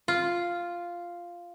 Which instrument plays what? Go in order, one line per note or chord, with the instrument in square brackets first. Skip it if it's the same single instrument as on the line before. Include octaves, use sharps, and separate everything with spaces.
[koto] F4